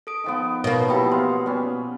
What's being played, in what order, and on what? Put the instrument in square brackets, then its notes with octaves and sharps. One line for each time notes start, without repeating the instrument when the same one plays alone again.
[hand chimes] A4 D#6 D7
[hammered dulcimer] D#3 F3 B3
[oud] B2 A#3 [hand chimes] A4 A#4 C#5
[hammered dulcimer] F3 F#3 E4 [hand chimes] G4 G5 B5
[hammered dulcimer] B3 F5 [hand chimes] C6
[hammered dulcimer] G3 C#4